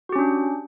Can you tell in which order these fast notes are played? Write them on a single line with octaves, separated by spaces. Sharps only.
F#4 G4 C#4 D4